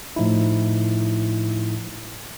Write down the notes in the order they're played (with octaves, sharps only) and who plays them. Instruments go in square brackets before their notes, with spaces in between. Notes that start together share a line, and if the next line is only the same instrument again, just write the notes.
[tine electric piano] A2 F3 D#4 E4